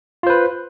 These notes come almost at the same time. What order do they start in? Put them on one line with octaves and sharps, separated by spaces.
F4 C5 B4